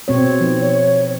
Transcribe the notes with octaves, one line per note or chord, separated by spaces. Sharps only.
B2 C4 C#5
F3 D#4
C#5